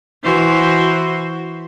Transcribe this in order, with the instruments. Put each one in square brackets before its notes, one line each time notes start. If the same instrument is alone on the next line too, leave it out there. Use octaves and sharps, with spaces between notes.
[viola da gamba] E3 F#4 C5